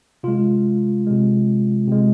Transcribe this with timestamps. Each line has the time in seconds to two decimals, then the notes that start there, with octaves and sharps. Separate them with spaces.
0.23 C3 G#3 F4
1.06 C3 G#3
1.88 C3 G#3